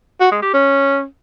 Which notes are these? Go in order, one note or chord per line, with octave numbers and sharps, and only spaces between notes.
F#4
G#3
G4
C#4